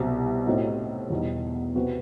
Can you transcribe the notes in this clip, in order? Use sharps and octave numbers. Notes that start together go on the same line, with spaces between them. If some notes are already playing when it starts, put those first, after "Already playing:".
Already playing: C2 B2 F#3 C4
A2 F#3 C4 D#4
E2 B2 G3 D#4
C3 F#3 C4 F#4 B4